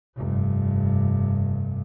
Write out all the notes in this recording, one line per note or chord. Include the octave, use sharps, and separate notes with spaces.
F1 G2